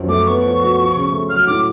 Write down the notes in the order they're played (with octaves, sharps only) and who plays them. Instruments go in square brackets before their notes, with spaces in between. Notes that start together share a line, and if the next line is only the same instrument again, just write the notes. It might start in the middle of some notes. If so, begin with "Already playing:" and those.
Already playing: [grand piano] F#2 F3
[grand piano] A3 [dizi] D6
[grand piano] B3 [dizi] C#6
[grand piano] F3
F#4
F3
C#3
A3
[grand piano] F#3 [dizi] F6
[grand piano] A2 [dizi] D6